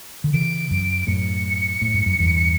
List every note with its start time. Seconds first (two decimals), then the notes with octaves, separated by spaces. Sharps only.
0.24 D3
0.33 C#3 E3 D7
0.71 F#2
1.07 F#2 A2 C#7
1.82 A2
1.94 G2
2.06 F#2
2.18 E2 G2